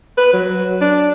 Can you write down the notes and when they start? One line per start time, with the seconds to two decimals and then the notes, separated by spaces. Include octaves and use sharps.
0.18 B4
0.33 F#3
0.81 D4